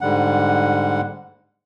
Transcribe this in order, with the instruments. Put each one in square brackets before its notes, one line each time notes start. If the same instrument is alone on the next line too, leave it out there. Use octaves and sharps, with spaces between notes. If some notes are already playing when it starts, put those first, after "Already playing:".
[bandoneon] G#2 D3 G3 F#5